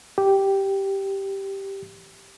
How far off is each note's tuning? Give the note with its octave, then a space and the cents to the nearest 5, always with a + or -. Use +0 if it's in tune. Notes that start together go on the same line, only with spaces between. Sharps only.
G4 -5